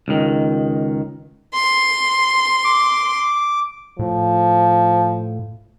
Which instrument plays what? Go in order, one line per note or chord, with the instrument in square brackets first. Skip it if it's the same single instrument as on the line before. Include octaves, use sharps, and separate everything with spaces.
[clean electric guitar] C#2 D#3
[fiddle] C6
[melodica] D6
[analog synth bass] A2 [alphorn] F3